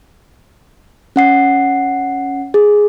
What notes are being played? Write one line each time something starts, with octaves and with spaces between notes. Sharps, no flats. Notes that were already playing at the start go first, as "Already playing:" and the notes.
C#4 F#5 C7
G#4